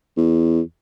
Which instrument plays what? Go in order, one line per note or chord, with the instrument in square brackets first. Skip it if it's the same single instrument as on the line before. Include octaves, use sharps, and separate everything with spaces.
[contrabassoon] E2